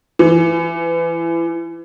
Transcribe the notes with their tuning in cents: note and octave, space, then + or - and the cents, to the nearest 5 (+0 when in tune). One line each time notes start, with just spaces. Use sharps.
E3 +25